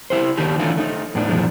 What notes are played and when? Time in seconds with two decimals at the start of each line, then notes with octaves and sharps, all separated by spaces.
0.10 E4 G4 C5
0.37 D#3 D4 D#4 G4
0.60 D3 E3 A3 C#4 D#4 F4
0.77 A3 D#4
1.15 A2 G#3 B3 D4
1.29 F#2 A#2 E3 F3 G#3